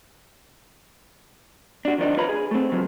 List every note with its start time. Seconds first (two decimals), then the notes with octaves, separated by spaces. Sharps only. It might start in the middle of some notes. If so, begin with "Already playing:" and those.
1.85 D4 F#4
1.98 D#3 F3 D4 D#4
2.17 F4 B4 C#5 A#5 B5
2.29 G#4
2.51 A3 C4
2.72 C#3 F3 F#3